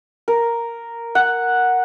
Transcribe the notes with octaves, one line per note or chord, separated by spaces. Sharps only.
A#4
F#5